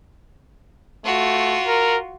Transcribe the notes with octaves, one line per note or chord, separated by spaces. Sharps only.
A3 F4 F#4
A#4